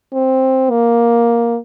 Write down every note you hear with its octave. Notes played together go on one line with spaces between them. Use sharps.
C4
A#3